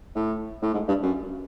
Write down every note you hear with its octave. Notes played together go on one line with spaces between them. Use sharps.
A2
A2
G#2
G2
F#2